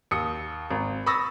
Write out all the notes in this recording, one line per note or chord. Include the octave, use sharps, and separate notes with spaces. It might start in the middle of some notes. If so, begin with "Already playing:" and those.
D#2 D#6 C#7
G#1
B5 C#6 D#6 E6 A6 A#6